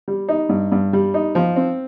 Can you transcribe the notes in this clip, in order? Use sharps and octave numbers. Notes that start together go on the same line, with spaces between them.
G3
D#4
G2
G2
G3
D#4
F3
C4